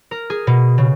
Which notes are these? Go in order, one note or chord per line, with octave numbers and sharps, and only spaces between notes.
A#4
G#4
B2
C#3